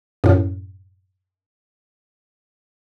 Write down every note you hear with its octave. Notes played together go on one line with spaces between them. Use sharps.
F#2 A2